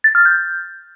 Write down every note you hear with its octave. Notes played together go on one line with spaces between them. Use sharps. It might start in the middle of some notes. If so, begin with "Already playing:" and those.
A6
F6
G6